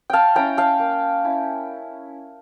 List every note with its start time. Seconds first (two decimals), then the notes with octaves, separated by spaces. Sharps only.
0.10 F5 G5 A5
0.35 C#4 E4 G5 A#5
0.57 F5 A5
0.79 A#3
1.25 C#4 E4